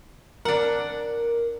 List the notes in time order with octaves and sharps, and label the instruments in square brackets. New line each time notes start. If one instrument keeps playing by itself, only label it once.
[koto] D4 F#5 [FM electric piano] A#4